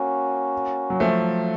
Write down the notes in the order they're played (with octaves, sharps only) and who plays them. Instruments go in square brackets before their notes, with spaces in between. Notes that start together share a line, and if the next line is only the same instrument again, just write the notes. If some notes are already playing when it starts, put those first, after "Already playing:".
Already playing: [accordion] A#3 C#4 F#4
[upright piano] F#3
F3 A3